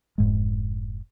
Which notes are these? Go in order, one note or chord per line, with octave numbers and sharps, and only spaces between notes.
F1 G#2 G#3